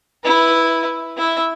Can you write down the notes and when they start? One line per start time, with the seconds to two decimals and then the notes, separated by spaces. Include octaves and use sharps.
0.24 E4 B4
1.17 E4 E5